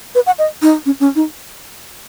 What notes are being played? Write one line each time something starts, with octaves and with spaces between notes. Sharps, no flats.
B4
F#5
D#5
D#4
C#4
C#4
D#4